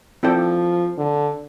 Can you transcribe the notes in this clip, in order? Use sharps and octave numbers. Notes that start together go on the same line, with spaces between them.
F3 C4 E4 A4 D5 G5
D3